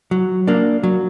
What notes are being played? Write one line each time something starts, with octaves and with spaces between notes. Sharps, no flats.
F#3
A#3 D4
F#3